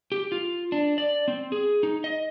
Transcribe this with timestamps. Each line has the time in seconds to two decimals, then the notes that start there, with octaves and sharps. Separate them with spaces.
0.12 G4
0.32 F4
0.72 D4
0.98 D5
1.28 C4
1.52 G#4
1.83 D#4
2.04 D#5